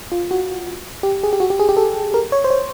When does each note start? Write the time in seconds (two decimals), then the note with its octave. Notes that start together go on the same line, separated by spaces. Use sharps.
0.12 F4
0.31 F#4
1.03 G4
1.24 G#4
1.33 G4
1.40 F#4
1.50 G4
1.60 G#4
1.69 G4
1.77 A4
2.14 A#4
2.32 C#5
2.44 C5
2.50 C#5